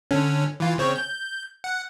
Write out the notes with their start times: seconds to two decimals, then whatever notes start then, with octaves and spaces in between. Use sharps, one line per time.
0.11 D3 C#4
0.60 E3 F4
0.78 C#3 C4 C#5
0.96 G6
1.64 F#5